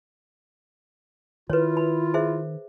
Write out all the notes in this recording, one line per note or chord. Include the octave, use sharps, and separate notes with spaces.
D#3 E4 F4 B4 C#5
B5
G#4 C5 E5